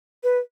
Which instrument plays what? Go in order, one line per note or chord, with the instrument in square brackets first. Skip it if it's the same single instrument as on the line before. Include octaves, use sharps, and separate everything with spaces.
[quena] B4